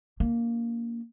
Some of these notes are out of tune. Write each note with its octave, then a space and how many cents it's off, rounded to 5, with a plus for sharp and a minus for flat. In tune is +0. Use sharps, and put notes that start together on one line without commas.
A#3 +0 D4 -35